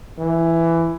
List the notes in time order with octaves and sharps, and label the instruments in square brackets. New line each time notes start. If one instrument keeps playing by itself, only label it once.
[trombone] E3